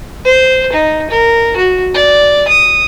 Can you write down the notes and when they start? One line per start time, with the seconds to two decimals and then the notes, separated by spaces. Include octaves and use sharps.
0.25 C5
0.73 D#4
1.10 A#4
1.56 F#4
1.94 D5
2.48 D#6